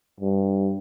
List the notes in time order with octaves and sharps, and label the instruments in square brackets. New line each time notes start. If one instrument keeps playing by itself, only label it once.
[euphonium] G2